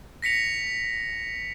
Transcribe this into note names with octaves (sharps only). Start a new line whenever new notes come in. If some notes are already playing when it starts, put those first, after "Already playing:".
A#6 B6 C#7 F7